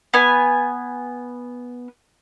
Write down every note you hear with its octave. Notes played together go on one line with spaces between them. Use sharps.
B3 G#5